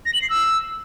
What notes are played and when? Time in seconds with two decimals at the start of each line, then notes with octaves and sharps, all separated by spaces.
0.06 A#6
0.14 F#7
0.22 C7
0.30 E6